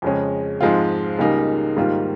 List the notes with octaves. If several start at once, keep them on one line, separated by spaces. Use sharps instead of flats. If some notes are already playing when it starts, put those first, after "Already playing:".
F2 C#3 G#3 C#4
G#2 F3 G#3 C4 F4
C#2 C#3 G3 A#3 D#4
G#2 D#3 G3 A#3 F4